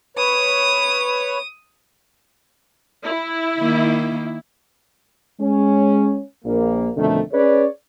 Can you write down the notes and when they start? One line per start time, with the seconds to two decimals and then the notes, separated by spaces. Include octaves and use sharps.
0.17 B4 C#5 D#6
3.04 E4
3.58 D#3 A#3
5.40 G#3 C#4
6.45 A#1 A#3
6.97 F2 B2 D3 D#3 A3
7.33 C#4 G#4 B4 C#5 D5